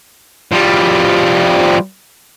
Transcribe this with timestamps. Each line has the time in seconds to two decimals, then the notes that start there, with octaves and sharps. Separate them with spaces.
0.52 F3 G3